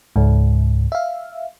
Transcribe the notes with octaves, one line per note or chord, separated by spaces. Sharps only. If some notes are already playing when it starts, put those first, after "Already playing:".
C#2 G#2
E5 F5